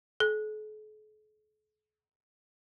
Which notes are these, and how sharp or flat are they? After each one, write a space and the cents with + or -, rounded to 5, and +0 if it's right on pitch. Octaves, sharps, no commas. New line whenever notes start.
A4 -45